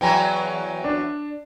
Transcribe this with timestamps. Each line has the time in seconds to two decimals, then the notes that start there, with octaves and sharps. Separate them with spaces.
0.01 E2 E3 F#3 G5 G#5 A#5
0.84 D4